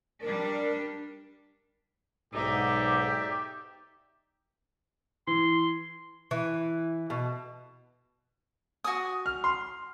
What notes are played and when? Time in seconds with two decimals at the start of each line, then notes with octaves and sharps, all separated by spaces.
0.21 G3 D4 A#4
2.34 B1 G#2 D#4 G4 D5 E5
5.27 E3 C6
6.31 E3
7.10 B2
8.84 F#4 G#5 D#6
9.26 F6
9.44 C6